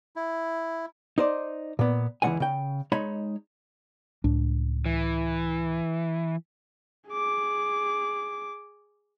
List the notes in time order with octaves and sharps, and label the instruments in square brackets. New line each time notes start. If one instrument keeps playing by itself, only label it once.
[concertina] E4
[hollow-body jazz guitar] D#4 C5 D5
A#2 B3
C#2 E3 G#3 C4 F#5 G#5
C#3 G5
G#3 D#4 C#5 B5
[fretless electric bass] C#2 A2 D4
[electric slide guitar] E3
[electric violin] G#4 D6